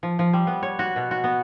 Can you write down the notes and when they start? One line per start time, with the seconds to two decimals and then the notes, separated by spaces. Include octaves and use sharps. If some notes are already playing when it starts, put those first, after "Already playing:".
0.03 F3
0.19 F3
0.33 G3
0.47 B3
0.63 C#5
0.79 F#4
0.96 B2
1.11 F#4
1.24 B3